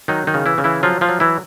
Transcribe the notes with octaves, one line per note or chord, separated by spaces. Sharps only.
D#3 F#3 D#4
D#3 D#4
C#3
E3 E4
C#3
E3 E4
F3 F#3 F4
F3 F4
F#3
E3 E4